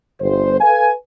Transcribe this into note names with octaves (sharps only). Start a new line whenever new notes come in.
G1 C5
A4 B4 F5 G#5